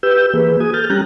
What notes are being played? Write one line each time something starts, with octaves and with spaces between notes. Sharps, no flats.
G4 B4 E6 G6
E3 A#3 G#4 B4
F#4 G#4 G#5 D#6
A4 F6 G6 A6
G3 C#4 G4 A#5 F#6